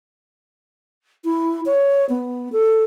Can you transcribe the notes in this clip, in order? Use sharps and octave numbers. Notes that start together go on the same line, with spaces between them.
E4
C#5
B3
A4